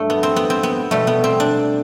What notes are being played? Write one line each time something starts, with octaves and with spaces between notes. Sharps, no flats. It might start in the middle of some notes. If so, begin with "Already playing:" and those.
Already playing: G2 F#3 A3
B3
C4
B3
C4
B3
B2 G3 A3
B3
C4
D4